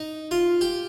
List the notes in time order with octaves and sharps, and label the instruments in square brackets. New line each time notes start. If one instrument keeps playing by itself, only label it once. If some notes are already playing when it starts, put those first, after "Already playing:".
Already playing: [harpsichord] D#4
F4
G4